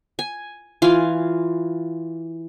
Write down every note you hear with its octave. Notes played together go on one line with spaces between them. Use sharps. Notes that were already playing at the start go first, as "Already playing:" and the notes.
G#5
E3 F4 G#5